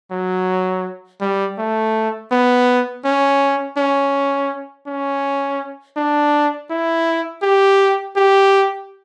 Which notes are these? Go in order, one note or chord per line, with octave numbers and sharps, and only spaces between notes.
F#3
G3
A3
B3
C#4
C#4
C#4
D4
E4
G4
G4